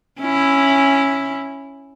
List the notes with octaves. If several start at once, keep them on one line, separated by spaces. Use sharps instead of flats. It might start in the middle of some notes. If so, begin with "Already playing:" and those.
C#4 E4